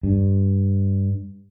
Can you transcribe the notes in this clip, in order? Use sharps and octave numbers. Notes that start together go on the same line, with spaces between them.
G2